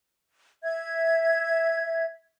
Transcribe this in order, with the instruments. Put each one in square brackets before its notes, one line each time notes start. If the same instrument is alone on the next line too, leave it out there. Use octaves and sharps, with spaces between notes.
[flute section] E5 G#6